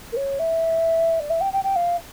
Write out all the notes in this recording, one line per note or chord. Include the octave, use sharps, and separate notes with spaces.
A#4
C#5
E5
D5
E5
G5
G5
G5
F5